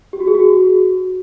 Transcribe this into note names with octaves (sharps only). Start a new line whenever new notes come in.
G4
F#4
G#4
F#4